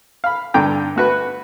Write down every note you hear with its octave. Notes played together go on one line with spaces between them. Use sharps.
F5 B5
G2 D3 G5 A#5 D6
A3 F#4 B4